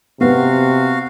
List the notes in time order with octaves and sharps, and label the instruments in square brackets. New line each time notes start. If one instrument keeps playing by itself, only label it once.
[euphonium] C3 [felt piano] B3 [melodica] F#4 F5